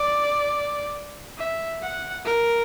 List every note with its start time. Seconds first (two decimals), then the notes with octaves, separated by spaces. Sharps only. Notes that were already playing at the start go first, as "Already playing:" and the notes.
Already playing: D5
1.38 E5
1.82 F#5
2.26 A#4